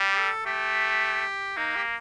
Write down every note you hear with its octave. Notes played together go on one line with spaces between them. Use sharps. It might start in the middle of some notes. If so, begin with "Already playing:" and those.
Already playing: G3
G4
A4
A3 G4
A#3 D#4
G4